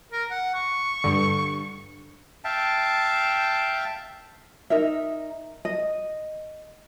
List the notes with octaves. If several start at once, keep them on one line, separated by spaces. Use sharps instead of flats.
A#4
F#5
C#6
G2 D3
E5 F5 G5 A5
D#4 A#4 E5
D#5